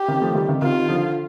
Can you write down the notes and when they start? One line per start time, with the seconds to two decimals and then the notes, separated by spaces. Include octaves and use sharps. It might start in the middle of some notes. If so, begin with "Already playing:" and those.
Already playing: G4
0.08 C3 D#3
0.21 F3 A3
0.35 D#3 G3
0.49 C3 D#3
0.62 C3 D#3 F4
0.89 D3 F3